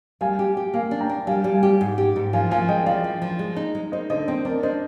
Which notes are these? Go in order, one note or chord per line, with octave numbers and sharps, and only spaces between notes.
G3 F5 G#5
G4
G4
A#3 F5 G#5
D4
G5 A#5
D4
G3 F5 G#5
G3
F5 G#5
G4
G#2
G4
G#2
F3 F5 G#5
F3 F5 G#5
G#3 D#5 G5
F3 D5 F5
F3
F3
G#3
D#4
G#3
D#4 C5 D#5
D3 C5 D#5
C4 C5 D#5
D4 A#4 D5
D4 C5 D#5